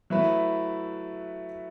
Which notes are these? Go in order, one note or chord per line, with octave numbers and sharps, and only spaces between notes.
F#3 A3 E4 B4